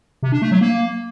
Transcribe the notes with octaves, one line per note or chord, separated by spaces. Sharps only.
C3
D4
A3
F#3
A#3